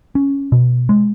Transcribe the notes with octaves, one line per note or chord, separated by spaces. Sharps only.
C#4
B2
G#3